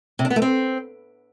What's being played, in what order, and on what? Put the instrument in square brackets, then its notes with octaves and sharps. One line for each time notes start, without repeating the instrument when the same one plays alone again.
[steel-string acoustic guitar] C3
D4
B3
A3
C4